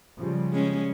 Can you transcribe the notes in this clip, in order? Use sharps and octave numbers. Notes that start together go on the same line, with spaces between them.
C#3 F3 G3
G#3 C#4